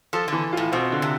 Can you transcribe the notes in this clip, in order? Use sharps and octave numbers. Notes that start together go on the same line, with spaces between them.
F3 A4
D3 E3
A2 F4
B2 C4
D3
C3